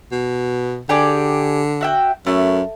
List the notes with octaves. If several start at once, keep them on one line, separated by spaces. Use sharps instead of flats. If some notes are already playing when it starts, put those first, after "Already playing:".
B2
D3 G4 G#4 D5
F#4 E5 G5
F#2 A3